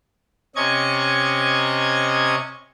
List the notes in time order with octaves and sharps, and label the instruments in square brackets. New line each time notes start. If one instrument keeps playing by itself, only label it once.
[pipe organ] C3 C#4 D#5 C#6 G#6